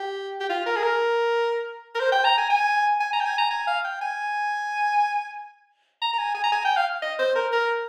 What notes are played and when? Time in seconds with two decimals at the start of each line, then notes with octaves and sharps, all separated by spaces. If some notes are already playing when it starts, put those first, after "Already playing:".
Already playing: G4
0.41 G4
0.49 F4
0.66 A#4
0.76 G#4
0.83 A#4
1.95 A#4
2.00 C5
2.12 G5
2.24 A#5
2.38 G#5
2.50 G#5
3.00 G#5
3.13 A#5
3.20 G5
3.26 G#5
3.38 A#5
3.51 G#5
3.67 F5
3.85 G5
4.01 G#5
6.02 A#5
6.13 A#5
6.18 G#5
6.35 G#5
6.44 A#5
6.52 G#5
6.65 G5
6.77 F5
7.02 D#5
7.19 C5
7.35 A#4
7.53 A#4